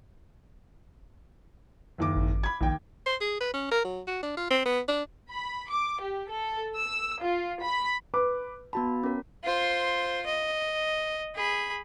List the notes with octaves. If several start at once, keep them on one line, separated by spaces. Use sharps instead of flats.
F#1 D#2 D6
G#1
B5 G#6
A#1 D#2 G5
C5
G#4
B4
C#4
A#4
F#3
F#4
D4
F4
C4
B3
D4
B5
D6
G4
A4
E6
F4
B5
B4 D6
B3 F#4 A5 B5
C#4 A#4
F4 C5
D#5
G#4 B5